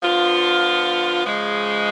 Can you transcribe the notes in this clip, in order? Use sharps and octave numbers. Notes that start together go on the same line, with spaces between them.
D3 F3 B3 F4
C#3 F3 G#3